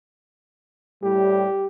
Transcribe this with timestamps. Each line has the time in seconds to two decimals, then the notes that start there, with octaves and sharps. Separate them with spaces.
1.03 A2 G3 G4